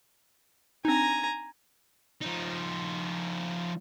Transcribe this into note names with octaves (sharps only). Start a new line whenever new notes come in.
C4 D4 D#4 G#5 A#5
F3 D#4